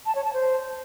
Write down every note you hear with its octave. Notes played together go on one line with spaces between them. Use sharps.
A5
C#5
A5
C5